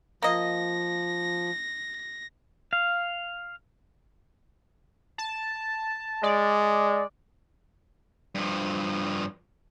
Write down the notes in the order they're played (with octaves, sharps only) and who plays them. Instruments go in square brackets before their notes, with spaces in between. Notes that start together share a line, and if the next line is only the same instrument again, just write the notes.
[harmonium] F3 [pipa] A#3 D#5 [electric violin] A#6
[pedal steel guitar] F5
[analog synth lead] A5
[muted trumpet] G#3 [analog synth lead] D5
[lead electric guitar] G2 F3